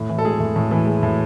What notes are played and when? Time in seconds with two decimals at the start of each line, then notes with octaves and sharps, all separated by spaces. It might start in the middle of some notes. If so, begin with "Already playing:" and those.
Already playing: A2
0.09 E3
0.18 A4
0.25 G#3 G#4
0.40 A2
0.56 A2
0.71 E3
0.87 G#3
1.03 A2